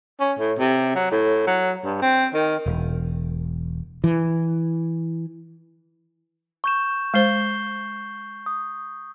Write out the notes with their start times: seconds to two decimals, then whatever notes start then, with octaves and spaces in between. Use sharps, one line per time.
0.19 C#4
0.38 A2
0.58 C3
0.95 F#3
1.11 A2
1.47 F#3
1.84 G2
2.02 C4
2.34 D#3
2.66 E1
4.04 E3
6.64 C#6 G6 E7
7.14 G#3 C5 G6 C7 G7
8.46 D#6